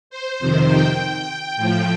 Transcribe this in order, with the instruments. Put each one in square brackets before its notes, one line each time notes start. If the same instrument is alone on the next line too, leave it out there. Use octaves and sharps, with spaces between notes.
[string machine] C5
F2 C3 D#3
G5
A2 F3